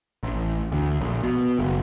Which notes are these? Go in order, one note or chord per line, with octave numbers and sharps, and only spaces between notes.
A1
D2
A#1
B2
F#1